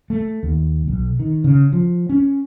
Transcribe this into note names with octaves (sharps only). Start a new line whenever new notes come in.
A3
D#2
B1
D#3
C#3
F3
C#4